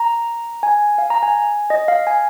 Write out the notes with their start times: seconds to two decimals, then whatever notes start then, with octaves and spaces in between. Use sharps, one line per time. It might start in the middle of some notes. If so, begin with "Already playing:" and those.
Already playing: A#5
0.63 G#5
0.98 F5
1.10 A#5
1.23 G#5
1.70 D#5
1.88 F5
2.07 G#5